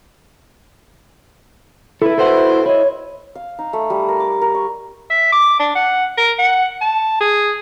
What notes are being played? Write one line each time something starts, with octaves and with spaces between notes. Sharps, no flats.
E4 A4 B4
B2 A4 B4 C5 F#5
E4 C#5 D#5
F5
D#4
A3
G3
A#4
D6
A#4
C#6
E5
D6
D4
F#5
A#4
F#5
A5
G#4